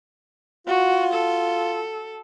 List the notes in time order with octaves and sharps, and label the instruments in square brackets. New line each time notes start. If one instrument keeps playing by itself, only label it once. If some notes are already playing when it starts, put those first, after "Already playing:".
[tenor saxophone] F4 [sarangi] F#4
[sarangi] A4